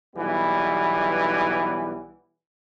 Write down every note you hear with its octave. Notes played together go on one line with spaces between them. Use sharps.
B1 E3 G3 B3